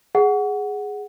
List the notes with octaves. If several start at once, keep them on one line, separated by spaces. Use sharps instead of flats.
G#4 F#5